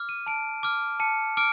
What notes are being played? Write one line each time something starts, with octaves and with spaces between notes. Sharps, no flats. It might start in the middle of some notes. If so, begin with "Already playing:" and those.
Already playing: D6 F6
D#7
A5 D7
D6 F6
A5 C#7
D6 F6 D7